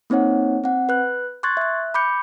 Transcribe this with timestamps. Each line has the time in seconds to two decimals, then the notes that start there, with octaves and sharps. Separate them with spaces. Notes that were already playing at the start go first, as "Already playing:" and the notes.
0.10 A#3 C4 D#4 C#5 F#5
0.64 C4 F#5
0.89 B4 F#6
1.43 C6 C#6 F#6 G#6 A6
1.57 E5 F#6
1.94 B5 D6 G6 C#7